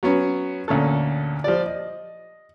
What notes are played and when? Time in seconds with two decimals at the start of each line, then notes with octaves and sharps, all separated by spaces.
0.03 F#3 B3 C#4
0.68 D2 A#2 C#4 A4
1.44 F3 G3 D5
1.66 D#5